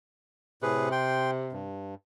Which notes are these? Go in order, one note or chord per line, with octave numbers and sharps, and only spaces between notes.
A2 C3 G#4 B4
G5 C6
G2